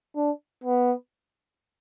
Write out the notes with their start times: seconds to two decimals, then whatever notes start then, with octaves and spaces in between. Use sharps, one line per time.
0.16 D4
0.64 B3